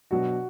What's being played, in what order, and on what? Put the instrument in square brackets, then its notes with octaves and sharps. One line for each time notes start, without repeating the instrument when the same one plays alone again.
[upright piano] B2 F#3 D4 [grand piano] F#4